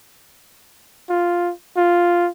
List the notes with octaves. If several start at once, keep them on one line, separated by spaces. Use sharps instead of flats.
F4
F4